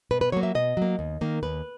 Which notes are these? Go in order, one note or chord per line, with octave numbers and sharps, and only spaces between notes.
B2 B4
B4
F#3 A#3 C#5
E5
B2 D#5
F#3 A#3
D#2
D#3 A#3
D#2 B4